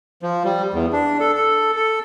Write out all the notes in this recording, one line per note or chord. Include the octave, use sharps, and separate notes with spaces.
F3
G3
E2
D4
A4
A4
A4